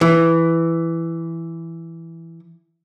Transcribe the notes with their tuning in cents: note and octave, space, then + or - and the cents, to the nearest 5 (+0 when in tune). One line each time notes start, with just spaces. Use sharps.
E3 +5